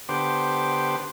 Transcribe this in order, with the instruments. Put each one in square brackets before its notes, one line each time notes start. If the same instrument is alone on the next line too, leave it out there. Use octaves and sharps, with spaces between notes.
[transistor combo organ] D3 B3 G4 C5 C6 D6